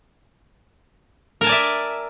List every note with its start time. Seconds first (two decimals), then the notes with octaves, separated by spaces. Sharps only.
1.41 A#4
1.44 A5
1.46 G#5
1.49 D5
1.52 E5